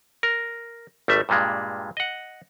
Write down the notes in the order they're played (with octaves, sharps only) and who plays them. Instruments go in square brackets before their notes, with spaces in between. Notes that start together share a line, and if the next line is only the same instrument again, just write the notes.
[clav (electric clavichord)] A#4
G#1 G3 A3 E5
G2 A#2 G3 G#3
D#5 F#5